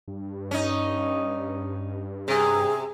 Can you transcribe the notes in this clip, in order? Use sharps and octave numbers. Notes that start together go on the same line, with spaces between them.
G2
C#4 D#4
C3 G#4